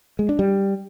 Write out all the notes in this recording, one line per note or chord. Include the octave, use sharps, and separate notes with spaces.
G#3
D4
G3